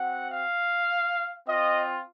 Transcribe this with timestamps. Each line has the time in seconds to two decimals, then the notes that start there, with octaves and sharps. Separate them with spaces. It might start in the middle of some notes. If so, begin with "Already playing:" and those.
Already playing: C4 F#4 F#5
0.30 F5
1.47 C4 F4 D#5